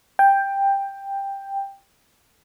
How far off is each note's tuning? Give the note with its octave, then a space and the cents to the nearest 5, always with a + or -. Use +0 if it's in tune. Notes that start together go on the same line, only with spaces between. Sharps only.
G5 +10